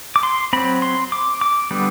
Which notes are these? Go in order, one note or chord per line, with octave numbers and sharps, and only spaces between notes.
D6
C6
F#3 C4 B5
C6
D6
D6
D3 G3 B3